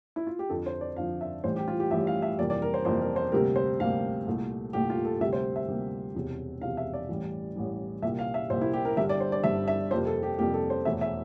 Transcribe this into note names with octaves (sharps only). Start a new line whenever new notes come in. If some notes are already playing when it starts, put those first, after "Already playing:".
E4
F4
G4
F2 D3 F3 A4
C5
D5
F2 D3 F3 F5
E5
A1 A2 E3 G3 C5
G4
F4
G4
A1 A2 E3 G3 E5
F5
E5
F2 C3 E3 G3 A#3 D5
D5
A#4
C5
F2 C3 E3 G3 A#3 C5
A#4
C5
D2 C3 G3 A#3 A#4
C5
D2 C3 G3 A#3 F5
C2 A#2 A3
C2 A#2 A3 G4
F4
A4
D2 C3 G3 A#3 E5
C5
E5
D2 C3 G3 A#3
E1 E2 C3
E1 E2 C3 F5
E5
D5
A1 A2 E3 G3
A1 A2 E3 G3
C2 A#2 G3 A#3 E5
F5
E5
C2 A#2 G3 A#3 C5
E4
G4
A#4
G1 G2 D3 G3 E5
D5
C5
D5
G1 G2 D3 G3 E5
E5
F2 C3 G3 A#3 C5
A4
G4
F2 C3 G3 A#3 G4
A4
C5
E1 E2 E3 A3 E5
E5